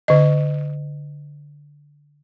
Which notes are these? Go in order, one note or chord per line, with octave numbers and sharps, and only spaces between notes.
D3 D#5